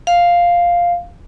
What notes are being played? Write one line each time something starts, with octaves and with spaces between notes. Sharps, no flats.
F5